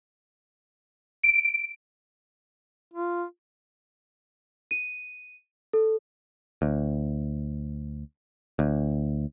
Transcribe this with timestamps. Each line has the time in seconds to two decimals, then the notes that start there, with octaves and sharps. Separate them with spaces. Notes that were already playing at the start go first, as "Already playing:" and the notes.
1.24 D7
2.94 F4
4.71 D#7
5.73 A4
6.62 D2
8.59 D2